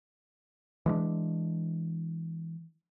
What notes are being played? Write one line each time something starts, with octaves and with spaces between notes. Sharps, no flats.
E3 G#3 A3 D4